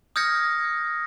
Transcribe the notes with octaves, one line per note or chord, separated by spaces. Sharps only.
D#6 F6 G6 G#6 A#6 C#7